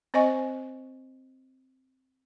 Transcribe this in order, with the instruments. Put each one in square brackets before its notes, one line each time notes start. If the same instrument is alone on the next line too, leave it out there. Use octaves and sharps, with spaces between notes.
[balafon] C4 C5 D#5 G#5 C#6